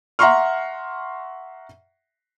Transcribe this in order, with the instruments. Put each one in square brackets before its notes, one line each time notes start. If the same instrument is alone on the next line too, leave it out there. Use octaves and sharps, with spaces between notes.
[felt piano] E5 F#5 A#5 C6 C#6 F6